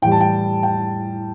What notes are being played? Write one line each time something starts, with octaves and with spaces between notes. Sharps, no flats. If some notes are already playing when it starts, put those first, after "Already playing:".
A2 E3 G3 G5
A5
G5
G5